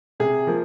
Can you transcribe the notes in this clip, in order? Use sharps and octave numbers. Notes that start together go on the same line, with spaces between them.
C3 G#4
F3 A#3